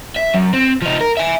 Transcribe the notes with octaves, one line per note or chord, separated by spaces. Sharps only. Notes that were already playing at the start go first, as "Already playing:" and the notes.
E5
F#2
C4
F3 D#4
A#4
E5 G#5